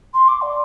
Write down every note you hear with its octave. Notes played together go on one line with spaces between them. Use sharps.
C6
D6
D5